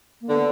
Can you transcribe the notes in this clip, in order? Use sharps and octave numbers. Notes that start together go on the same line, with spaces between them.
A#3
D3 B3